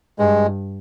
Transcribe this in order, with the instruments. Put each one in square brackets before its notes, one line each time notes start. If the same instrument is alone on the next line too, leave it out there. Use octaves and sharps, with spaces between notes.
[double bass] G2 [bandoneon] G#3